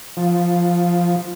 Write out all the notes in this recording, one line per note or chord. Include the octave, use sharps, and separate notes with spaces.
F3